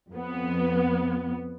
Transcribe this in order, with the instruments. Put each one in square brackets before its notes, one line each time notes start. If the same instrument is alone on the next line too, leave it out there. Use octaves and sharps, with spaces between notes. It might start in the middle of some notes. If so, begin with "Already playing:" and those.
[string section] F2 B3